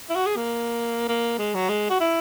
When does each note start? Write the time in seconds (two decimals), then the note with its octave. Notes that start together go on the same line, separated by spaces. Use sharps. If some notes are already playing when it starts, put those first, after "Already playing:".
0.10 E4
0.16 F#4
0.26 G#4
0.36 A#3
1.08 A#3
1.38 G#3
1.55 F#3
1.69 G#3
1.90 F#4
2.00 E4